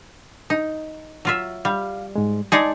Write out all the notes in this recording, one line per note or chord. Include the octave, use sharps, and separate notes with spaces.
D#4
F#3 F4 E5
G3 F5
G#2 G#3
G#3 D#4 G#4 D5 A5